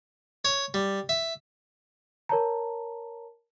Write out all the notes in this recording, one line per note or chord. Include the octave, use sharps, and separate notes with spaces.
C#5
G3
E5
A#4 C#5 A5 A#5